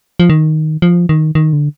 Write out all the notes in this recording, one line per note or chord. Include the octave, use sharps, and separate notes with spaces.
F3
D#3
F3
D#3
D#3
D3